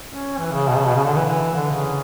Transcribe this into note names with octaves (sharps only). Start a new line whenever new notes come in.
C#4
E3
C#3
B2
C#3
B2
C#3
D3
E3
E3
D3
C#3